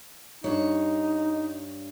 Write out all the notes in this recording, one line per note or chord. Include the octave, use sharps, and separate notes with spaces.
G2 D#4 C#5